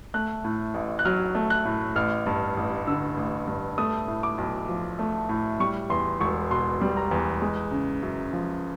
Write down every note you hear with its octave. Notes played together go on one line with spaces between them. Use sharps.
A3 F#6
A2
A1
F#6
F#3 F6
A3
F#6
A2
A1 F6
G2
A1
D3 E6
A1
G2
A3 D#6
A2
D6
B1
F3
A3
A2
G3 C#6
E2 C6
E1 C#6
B2 C6
G3
A#5
E2
G#3
C#3
F#2
F3